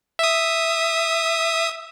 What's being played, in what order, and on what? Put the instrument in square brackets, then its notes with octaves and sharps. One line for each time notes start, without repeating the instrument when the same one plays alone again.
[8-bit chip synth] E5 D#6